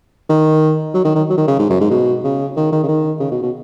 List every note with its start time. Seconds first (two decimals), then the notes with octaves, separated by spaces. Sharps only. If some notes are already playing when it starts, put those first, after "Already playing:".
0.29 D#3
0.94 F#3
1.05 D#3
1.15 D#3
1.30 F#3
1.37 D#3
1.48 C#3
1.59 G#2
1.70 F#2
1.81 G#2
1.91 B2
2.24 C#3
2.56 D#3
2.72 D#3
2.83 C#3
2.88 D#3
3.20 C#3
3.31 B2
3.43 B2